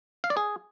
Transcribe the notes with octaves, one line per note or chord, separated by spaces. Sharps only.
F5
D5
G#4